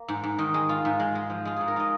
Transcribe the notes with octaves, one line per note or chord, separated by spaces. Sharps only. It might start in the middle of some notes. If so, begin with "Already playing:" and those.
Already playing: A#3
G#2
G#2
D#3
G#3
F4
G#2
G#3
G#3
F3
G#3 F4
G#2 G#4
A#4
F4 D#5